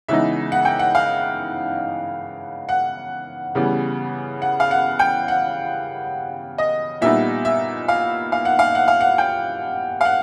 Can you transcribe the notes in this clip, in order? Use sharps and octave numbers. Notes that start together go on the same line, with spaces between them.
C#3 E3 G#3 B3 D#4 E5
F#5
G5
F#5
F5
F#5
C#3 E3 G3 B3
F#5
F5
F#5
G5
F#5
D#5
A#2 G3 B3 D#4 E5
E5
F5
F5
F#5
F5
F#5
F5
F#5
G5
F5
F#5